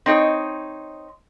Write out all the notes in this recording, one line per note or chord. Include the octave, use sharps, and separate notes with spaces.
C4 D#4 C#5 D#5